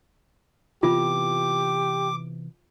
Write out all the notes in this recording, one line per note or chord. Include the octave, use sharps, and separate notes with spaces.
C3 E3 B3 F4 G4 D6